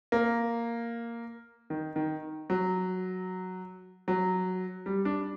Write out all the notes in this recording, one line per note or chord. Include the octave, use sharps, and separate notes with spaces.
A#3
D#3
D#3
F#3
F#3
G3
D4